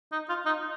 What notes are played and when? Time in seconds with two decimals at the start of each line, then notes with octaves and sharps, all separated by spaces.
0.12 D#4
0.29 F4
0.46 D#4